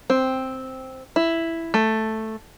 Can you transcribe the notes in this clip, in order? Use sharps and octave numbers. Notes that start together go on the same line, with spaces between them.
C4
E4
A3